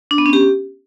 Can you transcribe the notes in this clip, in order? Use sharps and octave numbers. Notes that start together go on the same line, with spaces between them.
D4
B3
C#4
G4